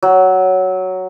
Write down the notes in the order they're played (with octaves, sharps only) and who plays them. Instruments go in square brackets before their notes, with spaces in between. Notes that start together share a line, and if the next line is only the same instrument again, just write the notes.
[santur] F#3